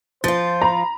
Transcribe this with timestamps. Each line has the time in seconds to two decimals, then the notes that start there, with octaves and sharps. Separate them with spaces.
0.24 F3 F4 C5 A6
0.62 A#5 B5